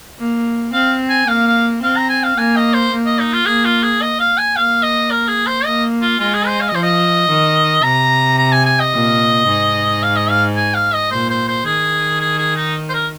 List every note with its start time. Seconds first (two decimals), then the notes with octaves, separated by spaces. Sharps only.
0.19 A#3
0.73 C4 F5
1.09 G#5
1.28 A#3 F5
1.47 F5
1.83 C4 F5
1.96 A#5
2.10 G#5
2.23 F5
2.37 A#3 G#5
2.56 D#5
2.74 C5
2.92 A#3
3.06 D#5
3.19 D#4
3.33 F4
3.46 A#3 G#4
3.65 F4
3.83 G#4
4.02 D#5
4.20 F5
4.38 G#5
4.56 A#3 F5
4.83 D#5
5.11 A#4
5.28 G#4
5.47 C5
5.65 A#3 D#5
6.02 F4
6.19 G#3 F4
6.34 G#4
6.47 C5
6.61 F5
6.68 D#5
6.74 F3 C5
6.83 D#5
7.29 D#3
7.83 C3 A#5
8.38 A#5
8.52 G#5
8.65 G#5
8.80 D#5
8.93 A#2
9.47 G#2
10.03 F5
10.16 D#5
10.30 F5
10.56 G#5
10.74 F5
10.94 D#5
11.11 A#2 C5
11.30 C5
11.48 C5
11.66 D#3 G#4
12.20 G#4
12.38 G#4
12.56 D#4
12.89 C5
12.94 A#4